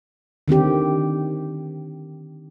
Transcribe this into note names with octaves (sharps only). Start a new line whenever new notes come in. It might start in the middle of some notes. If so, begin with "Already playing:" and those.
D3 D#3 C4 G4